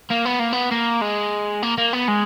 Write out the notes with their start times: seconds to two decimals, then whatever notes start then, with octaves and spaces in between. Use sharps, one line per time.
0.10 A#3
0.25 B3
0.39 A#3
0.53 B3
0.72 A#3
1.02 G#3
1.63 A#3
1.78 A#3
1.93 B3
2.08 G#3